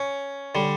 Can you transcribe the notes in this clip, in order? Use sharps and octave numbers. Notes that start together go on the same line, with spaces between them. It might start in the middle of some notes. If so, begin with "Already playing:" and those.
Already playing: C#4
D3 G3